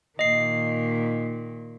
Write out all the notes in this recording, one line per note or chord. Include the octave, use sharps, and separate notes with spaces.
A#2 D#3 D#5 C7